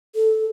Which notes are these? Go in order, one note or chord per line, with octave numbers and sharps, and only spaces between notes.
A4